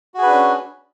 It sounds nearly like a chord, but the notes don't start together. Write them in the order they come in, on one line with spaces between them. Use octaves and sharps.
F#4 G#4 B4 D4 C#4